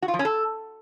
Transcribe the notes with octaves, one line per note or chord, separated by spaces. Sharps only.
F#4
F4
F3
C#4
A4